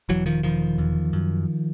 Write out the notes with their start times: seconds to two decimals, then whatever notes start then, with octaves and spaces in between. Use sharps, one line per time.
0.09 E1 E3 F#3
0.26 D#3 F3
0.43 E1 D#3 F3
0.78 E2
1.13 F#2